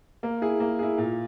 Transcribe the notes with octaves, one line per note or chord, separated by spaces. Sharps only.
A#3
E4 G#4
A#3
E4 G#4
A#2